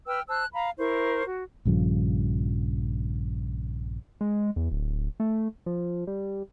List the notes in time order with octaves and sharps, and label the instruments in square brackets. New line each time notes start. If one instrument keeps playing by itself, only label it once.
[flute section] B4 G5 E6 F6
C5 A5 E6 F#6
F5 A#5 B5
E4 A#4 C5 C#6
F#4
[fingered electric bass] A#1 G2 C#3 F3
[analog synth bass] G#3
E2
D1
A3
F3
G3